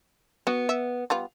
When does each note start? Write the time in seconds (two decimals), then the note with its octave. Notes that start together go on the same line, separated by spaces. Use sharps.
0.47 B3 F#4
0.69 E5
1.10 G3 B3 F4